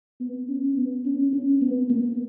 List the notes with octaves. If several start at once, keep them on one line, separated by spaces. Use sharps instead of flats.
B3
C#4
B3
C#4
C#4
B3
A#3